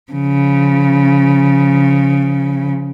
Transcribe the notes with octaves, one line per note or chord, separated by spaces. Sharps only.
C#3 F3